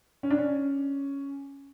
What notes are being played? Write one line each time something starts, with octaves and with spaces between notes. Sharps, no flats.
C#4
D4
C#4